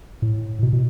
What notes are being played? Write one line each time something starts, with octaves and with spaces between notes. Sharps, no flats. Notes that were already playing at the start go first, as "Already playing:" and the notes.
A2
B2
B2